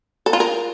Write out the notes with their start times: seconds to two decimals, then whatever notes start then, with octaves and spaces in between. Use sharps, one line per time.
0.26 A4
0.33 F4
0.40 A#4